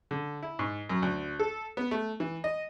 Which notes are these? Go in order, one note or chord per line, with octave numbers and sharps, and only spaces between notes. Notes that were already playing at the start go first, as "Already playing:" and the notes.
D3
E4
G#2
F#2
D2
A4
B3
A3
E3
D#5